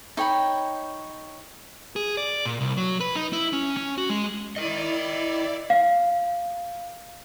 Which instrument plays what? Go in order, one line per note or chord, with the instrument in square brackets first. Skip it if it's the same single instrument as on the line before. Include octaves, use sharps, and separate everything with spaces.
[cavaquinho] D#4 C#5 G5 B5
[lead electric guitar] G#4
D5
A#2
C2
F#3
B4
D#4
E4
C#4
C#4
F#4
G#3
[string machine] E4 D5 [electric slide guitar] A#4 D#5
[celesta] F5